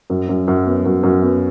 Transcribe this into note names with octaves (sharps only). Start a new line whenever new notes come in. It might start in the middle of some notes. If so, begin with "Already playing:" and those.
F#2
F#2
F#2
B3
F#2
F#2
B3